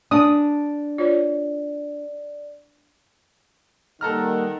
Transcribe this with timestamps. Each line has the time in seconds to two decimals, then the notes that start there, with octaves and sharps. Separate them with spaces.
0.11 D4 D#6
0.98 F4 C#5 D5
4.01 D#3 G3 A#3 D#4 A4 F#5 A#5 F6